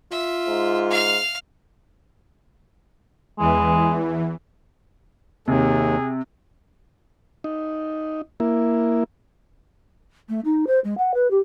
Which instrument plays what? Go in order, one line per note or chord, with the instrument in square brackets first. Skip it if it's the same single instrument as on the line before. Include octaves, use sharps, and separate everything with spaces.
[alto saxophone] F4 [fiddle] E5
[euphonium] G#2
[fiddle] F5 F6
[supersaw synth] E2 E3 [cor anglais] G#3
[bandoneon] D#2 [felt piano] C3 [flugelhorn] G#4
[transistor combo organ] D#4
A#3 E4
[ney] A3
D#4
C5
G#3
F#5
B4
G4